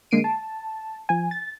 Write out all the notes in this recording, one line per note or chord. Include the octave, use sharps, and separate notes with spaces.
D3 G#3 A#3 C7 D7 D#7
A5
F3 G#5
A6